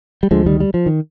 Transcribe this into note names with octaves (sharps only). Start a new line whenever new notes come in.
G3
D2 D3 F3 G#3
D#3 G3
G3
F3
D#3